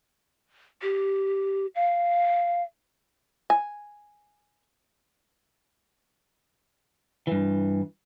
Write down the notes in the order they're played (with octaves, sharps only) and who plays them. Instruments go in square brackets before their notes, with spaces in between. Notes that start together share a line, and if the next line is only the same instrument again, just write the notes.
[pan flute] G4
F5
[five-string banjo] G#5
[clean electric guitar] G2 E3